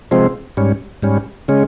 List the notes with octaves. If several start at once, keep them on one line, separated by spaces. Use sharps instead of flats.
C3 F3 G#3 C4
G#2 G3 C#4
G#2 G3 C#4
C#3 G#3 C#4